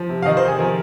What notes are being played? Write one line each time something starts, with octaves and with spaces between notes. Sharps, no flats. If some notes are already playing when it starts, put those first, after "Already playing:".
Already playing: F3
C3
F5
D#3 D#5
C5
C3
G#4
F3 A#4